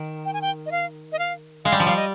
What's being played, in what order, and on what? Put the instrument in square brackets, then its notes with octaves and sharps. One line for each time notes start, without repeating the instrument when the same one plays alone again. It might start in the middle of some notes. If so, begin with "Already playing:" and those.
Already playing: [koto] D#3
[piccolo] G5
G#5
G5
D#5
F5
D#5
F5
[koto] G#3 [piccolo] F5
[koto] G3
F3
[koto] G3 [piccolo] F5
[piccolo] D#5